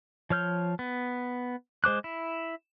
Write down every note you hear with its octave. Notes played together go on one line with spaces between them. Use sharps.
F3 C#5 F6 G6
B3
G#3 C5 D6 F#6
E4